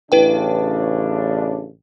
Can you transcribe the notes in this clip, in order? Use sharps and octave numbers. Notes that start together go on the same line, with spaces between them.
A1 C#3 D4 E4 B4 G5